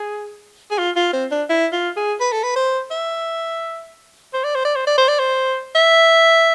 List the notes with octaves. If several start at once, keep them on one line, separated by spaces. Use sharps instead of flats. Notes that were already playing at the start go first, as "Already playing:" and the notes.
Already playing: G#4
G#4
F4
F4
C4
D4
E4
F4
G#4
B4
A4
B4
C5
E5
C5
D5
C5
D5
C5
D5
C5
D5
C5
E5